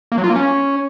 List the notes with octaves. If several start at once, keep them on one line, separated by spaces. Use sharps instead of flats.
A#3
F#3
F4
A#3
C#4